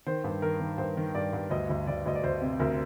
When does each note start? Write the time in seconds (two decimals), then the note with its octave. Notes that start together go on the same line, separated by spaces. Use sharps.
0.07 D#3 C5
0.24 G2
0.42 D#3 A#4
0.60 D#3
0.78 G2 C5
0.97 D#3
1.15 G2 D5
1.33 G2
1.50 D2 D#5
1.70 D2
1.87 D2 D5
2.06 D2 D#5
2.15 D5
2.23 D2 C5
2.41 C3
2.59 D2 A#4